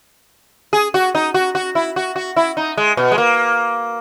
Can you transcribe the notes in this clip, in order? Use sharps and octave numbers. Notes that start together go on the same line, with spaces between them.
G#4
F#4
D#4
F#4
F#4
E4
F#4
F#4
E4
D#4
G#3
B2
G#3
A#3